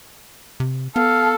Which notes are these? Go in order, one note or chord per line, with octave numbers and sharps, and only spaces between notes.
C3
B3 A4 F5